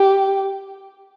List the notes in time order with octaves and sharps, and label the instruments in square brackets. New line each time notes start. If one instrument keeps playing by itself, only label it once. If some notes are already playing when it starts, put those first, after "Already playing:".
Already playing: [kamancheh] G4